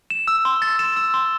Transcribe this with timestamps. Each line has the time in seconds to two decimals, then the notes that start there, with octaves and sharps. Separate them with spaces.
0.10 E7
0.28 E6
0.45 C6
0.62 A6
0.79 E7
0.97 E6
1.14 C6